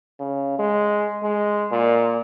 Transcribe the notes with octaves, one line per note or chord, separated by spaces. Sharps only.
C#3
G#3
G#3
A#2